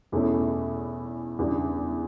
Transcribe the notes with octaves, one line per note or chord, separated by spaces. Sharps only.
E2 B2 A3 C#4 E4
E2 C#3 G3 D4